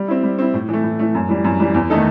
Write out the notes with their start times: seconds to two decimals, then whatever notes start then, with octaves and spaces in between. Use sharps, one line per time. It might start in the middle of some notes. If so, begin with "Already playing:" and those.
Already playing: G3
0.08 C4 E4
0.23 G3
0.39 C4 E4
0.54 A2
0.69 E3 A3
0.84 A2
0.99 E3 A3
1.15 F#2
1.29 E3 G3
1.44 F#2
1.60 E3 G3
1.74 E2
1.90 D#3 A3 D#4 A4